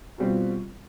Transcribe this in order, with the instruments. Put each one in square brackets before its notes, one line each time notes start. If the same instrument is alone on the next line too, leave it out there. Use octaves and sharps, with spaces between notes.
[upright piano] B2 G3 C4 F4